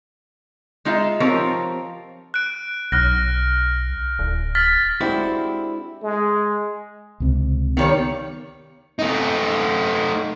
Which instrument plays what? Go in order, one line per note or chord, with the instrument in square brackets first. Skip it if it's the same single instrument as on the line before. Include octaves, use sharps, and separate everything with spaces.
[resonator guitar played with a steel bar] G#3 D#4 F4 D#5 E5
F3 C4 F4 G4 A#4 C#5
[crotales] F#6 D7
[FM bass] B1 [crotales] F6 F#6 A#6
[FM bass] D1
[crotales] F6 A6 B6
[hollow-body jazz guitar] G#3 C4 D4 E4 F#4 G4
[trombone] G#3
[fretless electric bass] C#2 C3
[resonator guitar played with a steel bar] D#3 G3 C#5 [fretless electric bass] B3
[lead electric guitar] A3 D#4